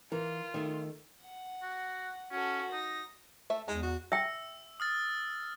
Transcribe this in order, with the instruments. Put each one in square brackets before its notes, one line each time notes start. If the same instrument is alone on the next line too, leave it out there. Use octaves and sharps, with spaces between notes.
[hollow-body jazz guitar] E3 [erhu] F4 [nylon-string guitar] A#4
[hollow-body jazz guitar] D#3 A3
[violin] F#5
[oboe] F#4
[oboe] C#4 [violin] F#4 A4
[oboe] D#4 [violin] A#6
[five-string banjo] A3 E5
[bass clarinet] E2 [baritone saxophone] G#3 [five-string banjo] D#4
[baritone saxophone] F#4
[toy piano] E5 G5 [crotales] E6
[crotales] D#6 F6 A6